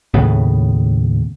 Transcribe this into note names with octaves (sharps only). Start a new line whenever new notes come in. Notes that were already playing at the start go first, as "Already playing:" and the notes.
D#2 A2 C#3 B3